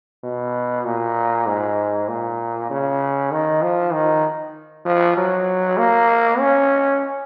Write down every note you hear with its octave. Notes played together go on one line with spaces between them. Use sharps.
B2
A#2
G#2
A#2
C#3
D#3
F3
D#3
F3
F#3
A#3
C#4